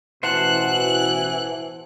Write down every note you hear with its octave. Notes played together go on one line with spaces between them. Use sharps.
A1 B2 E3 C5 F#5 A5 F#6